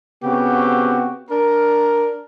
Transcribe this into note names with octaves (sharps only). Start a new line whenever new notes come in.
C#3 B3 C4 F#4 G4
D4 A#4